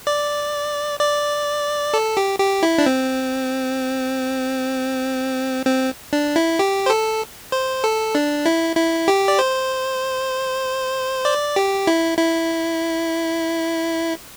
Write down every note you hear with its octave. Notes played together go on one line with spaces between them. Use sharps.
D5
D5
A4
G4
G4
E4
D4
C4
C4
D4
E4
G4
C5
A4
C5
A4
D4
E4
E4
G4
D5
C5
D5
G4
E4
E4